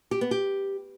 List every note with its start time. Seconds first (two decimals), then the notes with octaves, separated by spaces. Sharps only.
0.11 G4
0.21 B3
0.31 G4